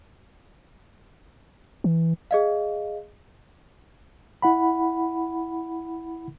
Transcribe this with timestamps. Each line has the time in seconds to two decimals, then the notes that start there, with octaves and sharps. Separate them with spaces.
1.84 E3
2.31 G#4 D#5 F5
4.42 E4 F#5 B5